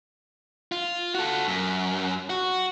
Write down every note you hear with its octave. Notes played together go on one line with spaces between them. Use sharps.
F4
F#4 A4
F#2
F#4